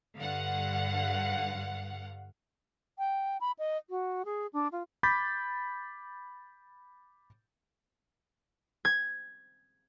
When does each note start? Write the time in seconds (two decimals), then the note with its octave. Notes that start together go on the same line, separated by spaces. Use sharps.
0.18 G2 D3 F5 F#5
2.98 G5
3.41 B5
3.59 D#5
3.90 F#4
4.25 G#4
4.53 D4
4.72 F4
5.03 B5 D6 G6 A6 B6
8.85 G#6